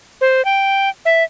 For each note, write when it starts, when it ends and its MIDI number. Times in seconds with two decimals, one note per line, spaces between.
0.21 0.44 72
0.45 0.89 79
1.05 1.23 76